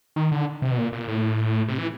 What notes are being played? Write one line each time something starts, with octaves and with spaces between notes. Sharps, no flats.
D#3
D3
C3
B2
A#2
A#2
A2
C3
E3